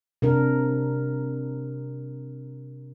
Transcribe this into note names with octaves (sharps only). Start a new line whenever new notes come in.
C3 D4 A#4